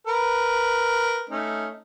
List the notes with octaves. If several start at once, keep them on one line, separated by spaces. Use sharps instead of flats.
A#4 B4
A3 C#4 D#4